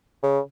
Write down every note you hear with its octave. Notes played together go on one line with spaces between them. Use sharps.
C#3